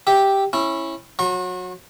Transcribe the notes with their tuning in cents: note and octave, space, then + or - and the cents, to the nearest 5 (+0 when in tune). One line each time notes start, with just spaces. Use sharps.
G4 +0 E5 -15
C#4 -20 E4 +0
F#3 -25 A#5 +15 C#6 -45